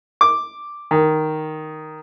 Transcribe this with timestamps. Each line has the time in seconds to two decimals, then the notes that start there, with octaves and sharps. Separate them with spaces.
0.21 D6
0.91 D#3